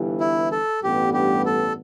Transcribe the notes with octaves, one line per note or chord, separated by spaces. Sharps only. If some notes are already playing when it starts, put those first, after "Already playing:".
Already playing: G1 G2 E3
E4
A4
A1 G2 G3 B3 G4
G4
A4